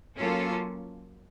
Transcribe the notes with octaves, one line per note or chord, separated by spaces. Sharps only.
F#3 A#3 C#4 F4 A4